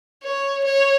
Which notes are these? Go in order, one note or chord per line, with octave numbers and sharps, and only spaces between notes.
C#5
C#5